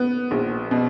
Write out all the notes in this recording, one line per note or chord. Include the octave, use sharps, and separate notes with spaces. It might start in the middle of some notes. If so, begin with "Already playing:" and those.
Already playing: B3
A#1
B2